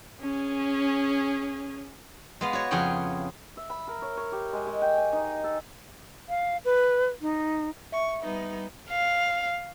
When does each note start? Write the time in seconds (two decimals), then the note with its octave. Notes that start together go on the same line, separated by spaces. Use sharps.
0.21 C#4 G#4
2.41 G#3 B3 F5
2.53 F#4 C#5
2.71 F2 C#3 G#4 C#5 F#5 G5
3.57 E5
3.70 B5
3.88 A#4
4.02 C#5
4.17 C#5
4.32 G4
4.53 G#3
4.67 G#3
4.82 G5
4.98 G#5
5.13 D#4
5.44 A4
6.29 F5
6.65 B4
7.21 D#4
7.92 E5 C#6
8.22 G3 B3 D#4
8.90 F5